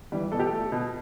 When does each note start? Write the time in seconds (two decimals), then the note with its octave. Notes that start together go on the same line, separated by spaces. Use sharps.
0.12 E3 G3
0.32 B2 A4
0.39 G4
0.47 A4
0.52 A3
0.72 B2